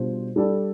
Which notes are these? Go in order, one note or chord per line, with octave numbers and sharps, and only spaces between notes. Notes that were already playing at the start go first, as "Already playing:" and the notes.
Already playing: B2 G3 D4 F4 C5
G3 D4 A4 D5